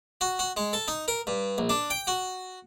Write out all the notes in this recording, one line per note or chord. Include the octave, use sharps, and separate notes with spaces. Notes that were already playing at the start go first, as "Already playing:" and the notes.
F#4
F#4
G#3
A4
D#4
A#4
G2
A#1
D4
G5
F#4